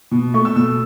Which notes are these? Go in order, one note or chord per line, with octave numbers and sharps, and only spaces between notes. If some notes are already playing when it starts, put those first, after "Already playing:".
B2
A3 C#6
E6
B2 E6